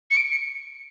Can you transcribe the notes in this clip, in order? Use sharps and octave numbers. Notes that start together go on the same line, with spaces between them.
C#7
D7
C#7